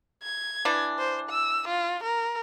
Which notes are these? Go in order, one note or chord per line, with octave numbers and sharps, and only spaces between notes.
G#6
E3 D4
C5
E6
F4
A#4